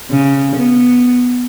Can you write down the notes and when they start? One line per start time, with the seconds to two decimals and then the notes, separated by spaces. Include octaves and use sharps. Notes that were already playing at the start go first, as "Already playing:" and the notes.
0.11 C#3
0.56 B3